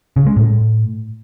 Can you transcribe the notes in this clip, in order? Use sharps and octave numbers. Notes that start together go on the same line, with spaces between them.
C#3
G#3
A2